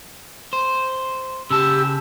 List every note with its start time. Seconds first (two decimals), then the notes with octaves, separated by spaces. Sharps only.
0.53 C5
1.51 C#3 G4 A5 E6